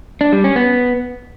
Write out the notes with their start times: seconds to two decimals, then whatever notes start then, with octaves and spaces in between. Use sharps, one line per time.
0.21 D4
0.32 G3
0.44 C#4
0.56 B3